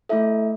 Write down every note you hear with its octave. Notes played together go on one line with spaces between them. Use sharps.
A3 E4 A4 E5